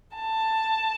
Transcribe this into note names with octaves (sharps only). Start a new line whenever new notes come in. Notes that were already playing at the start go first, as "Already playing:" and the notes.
A5